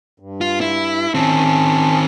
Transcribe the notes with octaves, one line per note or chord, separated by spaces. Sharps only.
G2
F4
E4
D#3 C4 C#4 A5